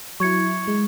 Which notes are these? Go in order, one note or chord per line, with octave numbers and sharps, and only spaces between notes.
F#3 E4 C#6 G#6 C#7
G#3